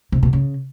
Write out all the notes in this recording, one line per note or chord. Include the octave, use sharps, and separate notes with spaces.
C3
B2
C#3